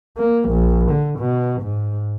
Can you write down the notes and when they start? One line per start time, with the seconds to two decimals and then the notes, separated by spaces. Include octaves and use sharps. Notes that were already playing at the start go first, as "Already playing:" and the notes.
0.18 A#3
0.50 A#1
0.90 D3
1.19 B2
1.62 G#2